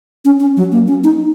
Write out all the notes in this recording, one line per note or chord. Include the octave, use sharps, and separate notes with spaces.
C#4
C#4
F#3
A#3
C#4
D#4